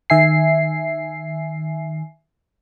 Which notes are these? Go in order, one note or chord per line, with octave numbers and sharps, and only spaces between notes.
D#3 E5 G#5 C7